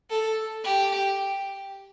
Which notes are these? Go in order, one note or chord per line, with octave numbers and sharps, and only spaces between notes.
A4
G4